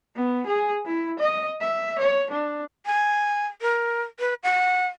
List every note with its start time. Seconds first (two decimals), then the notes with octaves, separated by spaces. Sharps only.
0.16 B3
0.47 G#4
0.85 E4
1.19 D#5
1.61 E5
1.99 C#5
2.31 D4
2.86 G#5
3.62 A#4
4.20 B4
4.43 F#5